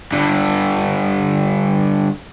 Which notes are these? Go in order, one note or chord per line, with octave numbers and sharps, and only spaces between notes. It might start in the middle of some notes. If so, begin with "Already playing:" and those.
G2 D3